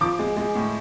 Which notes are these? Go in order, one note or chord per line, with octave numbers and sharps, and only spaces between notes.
F3 D6
G#3
G#3
A2